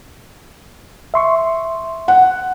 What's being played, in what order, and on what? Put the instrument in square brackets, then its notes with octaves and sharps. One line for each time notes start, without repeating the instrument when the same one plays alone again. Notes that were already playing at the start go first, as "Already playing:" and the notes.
[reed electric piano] E5 C6 C#6
[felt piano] F#5